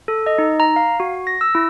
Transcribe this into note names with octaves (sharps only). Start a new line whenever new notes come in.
A4
D#5
D#4
A#5
F5
F#4
A#6
E6
E4